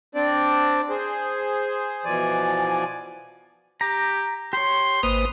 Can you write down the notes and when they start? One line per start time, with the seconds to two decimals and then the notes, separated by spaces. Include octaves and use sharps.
0.15 C4 D4 D5
0.90 G#4 C5
2.05 B2 E3 F3 D5 G#5
3.81 G4 A#5
4.53 G4 C#5 C6
5.03 G#1 A#3 B4 C5 D#6